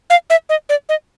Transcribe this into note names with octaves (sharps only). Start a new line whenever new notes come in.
F5
E5
D#5
D5
D#5